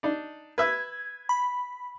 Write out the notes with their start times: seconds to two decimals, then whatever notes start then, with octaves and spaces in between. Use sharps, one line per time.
0.03 D4 D#4 D5
0.58 B4 E5 E6 G#6
1.29 B5